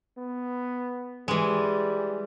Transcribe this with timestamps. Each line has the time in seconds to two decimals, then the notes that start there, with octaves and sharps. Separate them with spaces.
0.18 B3
1.28 E3 G3 G#3